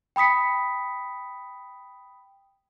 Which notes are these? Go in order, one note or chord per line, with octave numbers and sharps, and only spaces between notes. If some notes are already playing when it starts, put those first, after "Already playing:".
G5 B5 D#6 B6 C#7